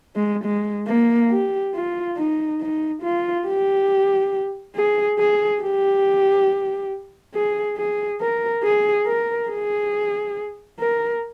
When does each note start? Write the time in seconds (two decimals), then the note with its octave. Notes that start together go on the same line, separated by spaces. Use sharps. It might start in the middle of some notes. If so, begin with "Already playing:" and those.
0.16 G#3
0.44 G#3
0.87 A#3
1.30 G4
1.75 F4
2.17 D#4
2.61 D#4
3.03 F4
3.47 G4
4.76 G#4
5.19 G#4
5.62 G4
7.34 G#4
7.77 G#4
8.21 A#4
8.64 G#4
9.06 A#4
9.49 G#4
10.79 A#4